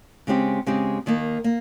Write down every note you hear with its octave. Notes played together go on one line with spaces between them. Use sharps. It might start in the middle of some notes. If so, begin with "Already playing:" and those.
C#3 G#3 C4 G4
C#3 G#3 C4 G4
D#2 D#3 A#3
A#3